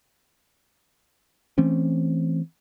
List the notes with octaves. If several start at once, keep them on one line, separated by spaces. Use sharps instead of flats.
E3 A3 C4 C#4